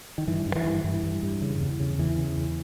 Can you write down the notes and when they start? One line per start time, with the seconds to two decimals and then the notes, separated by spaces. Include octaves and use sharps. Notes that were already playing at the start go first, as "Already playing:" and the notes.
0.18 D#3
0.27 G2 E3
0.46 G2
0.55 E3
0.65 G2
0.84 G2 E3
1.03 G2
1.23 G2
1.42 C#3
1.61 E2
1.80 C#3
1.99 E2 E3
2.18 C#3
2.37 E2